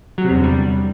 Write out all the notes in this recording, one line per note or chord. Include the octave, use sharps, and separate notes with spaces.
F#3
C3
E2
D3
G3